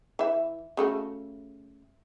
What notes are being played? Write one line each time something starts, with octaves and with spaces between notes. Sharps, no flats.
E3 E5
C#3 A3 F#4